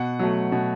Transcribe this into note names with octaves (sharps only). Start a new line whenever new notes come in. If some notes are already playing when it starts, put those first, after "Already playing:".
Already playing: B2 F#5
F#3 A3
B2